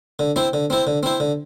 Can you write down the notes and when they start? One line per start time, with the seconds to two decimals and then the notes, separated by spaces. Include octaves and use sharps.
0.19 D3
0.36 C4 E4 C5
0.53 D3
0.70 C4 E4 C5
0.87 D3
1.03 C4 E4 C5
1.20 D3